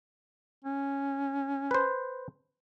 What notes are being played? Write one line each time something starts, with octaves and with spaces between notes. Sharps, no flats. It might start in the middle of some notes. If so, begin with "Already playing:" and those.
C#4
B4 C5